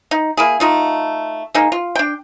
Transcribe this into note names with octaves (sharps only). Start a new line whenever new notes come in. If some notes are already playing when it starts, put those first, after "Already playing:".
D#4
A#3 E4 G#4
A3 D#4 F4
A#3 D#4 G#4
F4
D4 G5